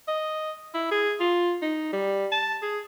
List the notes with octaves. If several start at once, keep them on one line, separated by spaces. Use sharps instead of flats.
D#5
E4
G#4
F4
D#4
G3
A5
G#4